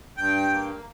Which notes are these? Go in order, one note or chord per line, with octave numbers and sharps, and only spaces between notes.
G2 G5
A#3